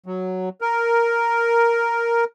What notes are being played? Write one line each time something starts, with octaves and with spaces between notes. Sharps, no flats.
F#3
A#4